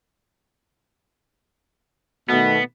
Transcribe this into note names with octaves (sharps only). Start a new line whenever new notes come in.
B2 D#3 A3 B3